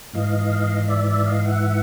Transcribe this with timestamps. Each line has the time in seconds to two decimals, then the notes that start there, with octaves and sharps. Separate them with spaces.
0.14 G#2 E3 D#5 F5
0.88 D5 E5
1.07 D5 E5
1.26 D#5 F5
1.45 E5 F#5